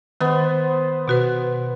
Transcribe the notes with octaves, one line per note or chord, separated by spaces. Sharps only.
D#3 B3 C5
B2 F#4 B4